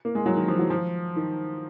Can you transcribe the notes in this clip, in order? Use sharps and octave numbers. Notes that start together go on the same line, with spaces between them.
A#3
G#3
F#3
D#3
F3
F#3
F3
D#3